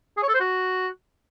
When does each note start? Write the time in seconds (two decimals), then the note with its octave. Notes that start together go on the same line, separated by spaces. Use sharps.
0.17 G#4
0.23 C#5
0.28 A4
0.34 C5
0.40 F#4